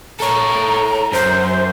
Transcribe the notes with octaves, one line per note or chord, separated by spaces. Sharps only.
A4 C#5 A#5
F#2 C5